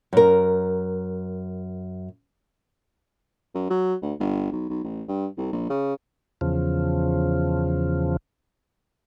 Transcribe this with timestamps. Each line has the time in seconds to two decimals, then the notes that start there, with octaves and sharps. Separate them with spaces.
0.13 F#2 A#4
3.55 F#2
3.70 F#3
4.02 D2
4.20 G1
4.52 B1
4.70 B1
4.84 A1
5.08 G2
5.37 C2
5.52 A#1
5.70 C#3
6.41 E2 C#3 F3